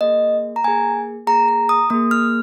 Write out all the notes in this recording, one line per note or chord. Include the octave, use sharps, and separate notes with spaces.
A#3 G#4 D#5
A#5
A#3 G#4 G#5
A#3 G#4 A#5
A#5
D#6
A#3 G#4 D#6
F6